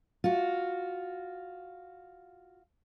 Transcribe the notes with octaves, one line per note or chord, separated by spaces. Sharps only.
F4 F#4